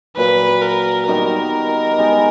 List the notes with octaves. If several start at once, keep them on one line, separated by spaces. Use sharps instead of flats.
A#2 F#3 A#3 B4
A#4
D#3 G3 B3 D#4 A#4
G#3 B3 D#4 G4